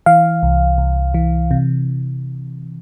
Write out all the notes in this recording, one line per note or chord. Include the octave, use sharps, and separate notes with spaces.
E3 F5
C2
C2
E3
C3